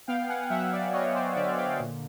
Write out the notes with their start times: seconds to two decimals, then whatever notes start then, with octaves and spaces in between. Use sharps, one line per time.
0.07 B3 F5 G5
0.29 F#5 G#5
0.50 F#3 E5 F#5
0.72 D5 E5
0.93 B3 C#5 D#5
1.14 C5 D5
1.36 D3 D5 E5
1.57 F5 G5
1.80 A#2